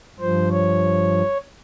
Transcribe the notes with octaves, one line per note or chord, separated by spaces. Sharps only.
G2 F3 C5
C#5